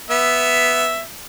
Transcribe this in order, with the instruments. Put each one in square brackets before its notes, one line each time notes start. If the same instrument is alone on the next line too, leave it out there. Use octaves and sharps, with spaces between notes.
[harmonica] B3 E5